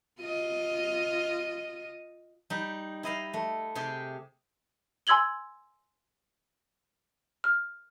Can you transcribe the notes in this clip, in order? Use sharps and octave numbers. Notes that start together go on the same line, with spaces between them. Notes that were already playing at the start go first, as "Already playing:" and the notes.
F4 D#5
G3 D#4
E4 D#5 F5
A3
C3 G4 G#4
G#5 C6 E6 G#6 F#7 G7
F6